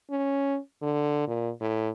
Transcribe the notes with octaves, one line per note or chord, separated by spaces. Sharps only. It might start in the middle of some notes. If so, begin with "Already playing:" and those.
C#4
D3
A#2
A2